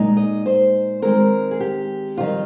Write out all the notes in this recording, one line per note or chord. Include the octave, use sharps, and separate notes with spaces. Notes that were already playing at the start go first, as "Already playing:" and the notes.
Already playing: A#2 G#3 D#4
D#5
C5
D#3 G#3 C4 A#4
G#4
G4
F2 D#3 G3 F4